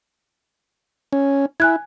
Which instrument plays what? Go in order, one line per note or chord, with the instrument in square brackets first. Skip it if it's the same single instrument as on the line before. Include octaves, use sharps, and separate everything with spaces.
[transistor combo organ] C#4
[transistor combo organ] E4 [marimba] G#5 F#6 G#6